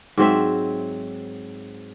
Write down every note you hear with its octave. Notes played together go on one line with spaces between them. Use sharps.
G#2 F#3 C4 E5